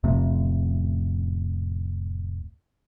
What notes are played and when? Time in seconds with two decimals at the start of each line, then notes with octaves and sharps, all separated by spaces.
0.04 D1 F2 C3 A3